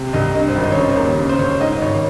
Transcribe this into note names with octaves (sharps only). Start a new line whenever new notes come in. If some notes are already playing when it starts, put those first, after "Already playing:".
Already playing: C3
C2 D#5
G2 D#5
C5
G#1
D#5
C#5
C#3 C5
C#5
D#2
C#3
C5
C#2 C#5
G#2 D#5
G#1 C#5